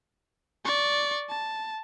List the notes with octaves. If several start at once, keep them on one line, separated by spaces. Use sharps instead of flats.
D5 C#6
A5